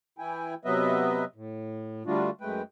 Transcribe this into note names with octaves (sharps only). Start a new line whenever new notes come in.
E3 E4 G5 G#5
C3 F#3 B3 B4 D#5 E5
A2
D3 G3 A3 D4 F4 F#4
F#2 G#3 A3 B4 G5